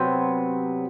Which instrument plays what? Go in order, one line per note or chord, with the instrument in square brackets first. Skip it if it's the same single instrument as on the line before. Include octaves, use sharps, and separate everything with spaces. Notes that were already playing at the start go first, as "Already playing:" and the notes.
Already playing: [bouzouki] C3 F#3 B3 [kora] C4